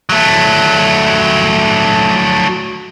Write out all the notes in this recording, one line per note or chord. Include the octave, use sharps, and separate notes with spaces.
F#3 A3